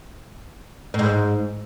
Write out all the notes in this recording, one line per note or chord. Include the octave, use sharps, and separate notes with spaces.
A2
G#2